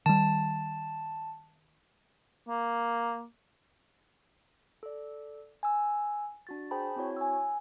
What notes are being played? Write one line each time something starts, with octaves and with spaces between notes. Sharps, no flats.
D#3 G3 A5
A#3
A4 D5
G#5 E6
D4 F#4 A6
G#4 C5 G5 A5 B5
C4 E4 F#4 C#5
G#5 E6